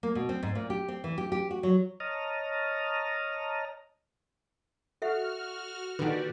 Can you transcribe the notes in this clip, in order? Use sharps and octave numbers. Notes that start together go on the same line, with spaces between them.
A#3
B2
C4
G#2
A#2
G4
C4
E3
G4
G4
F#4
F#3
C#5 D#5 A5 A#5 D#6 F6
F#4 A4 E5 F#5 F6
A#2 D3 D#3 F#4 G4 B4 D5